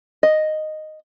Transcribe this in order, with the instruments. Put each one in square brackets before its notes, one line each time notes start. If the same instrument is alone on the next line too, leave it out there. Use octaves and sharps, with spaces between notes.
[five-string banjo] D#5